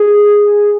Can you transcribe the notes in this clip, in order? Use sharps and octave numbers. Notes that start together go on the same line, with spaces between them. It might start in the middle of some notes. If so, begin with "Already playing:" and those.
Already playing: G#4